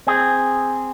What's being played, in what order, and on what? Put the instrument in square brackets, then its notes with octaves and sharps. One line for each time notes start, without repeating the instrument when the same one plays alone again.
[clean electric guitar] C4 G#4